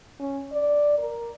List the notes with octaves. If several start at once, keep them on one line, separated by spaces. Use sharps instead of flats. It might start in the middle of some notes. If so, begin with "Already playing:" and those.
C#4
D5
A#4